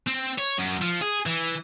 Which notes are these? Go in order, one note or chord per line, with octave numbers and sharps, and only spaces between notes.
C4
C#5
F#2
F3
G#4
E3